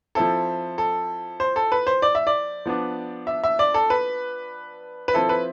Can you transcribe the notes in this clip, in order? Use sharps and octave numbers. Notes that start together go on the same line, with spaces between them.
F3 C4 E4 A4
A4
C5
A4
B4
C5
D5
E5
D5
F3 B3 D4
E5
E5
D5
A4
B4
B4
F3 C4 E4 A4
B4